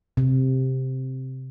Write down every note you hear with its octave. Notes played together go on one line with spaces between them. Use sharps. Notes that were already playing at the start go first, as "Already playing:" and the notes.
C3